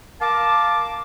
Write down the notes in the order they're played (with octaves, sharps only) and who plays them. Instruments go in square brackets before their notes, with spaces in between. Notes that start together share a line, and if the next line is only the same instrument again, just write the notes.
[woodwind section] A#4 F5 A5 [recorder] D6